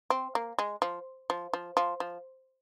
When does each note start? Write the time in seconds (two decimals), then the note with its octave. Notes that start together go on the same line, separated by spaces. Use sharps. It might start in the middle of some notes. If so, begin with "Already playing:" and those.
0.10 C4
0.35 A#3
0.59 G#3
0.82 F3
1.30 F3
1.53 F3
1.77 F3
2.00 F3